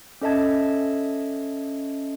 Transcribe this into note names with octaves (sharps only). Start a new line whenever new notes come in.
C#4 A4 D#5 E5 A5 G#6